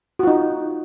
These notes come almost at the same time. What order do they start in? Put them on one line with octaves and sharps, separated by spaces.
F#4 F4 D#4